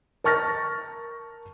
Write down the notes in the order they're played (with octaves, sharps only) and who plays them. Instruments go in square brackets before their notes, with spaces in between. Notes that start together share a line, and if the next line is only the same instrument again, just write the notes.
[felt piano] A#4 A5 C#6 F6 A6 A#6